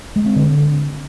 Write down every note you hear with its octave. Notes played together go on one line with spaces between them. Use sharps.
G#3
C4
D3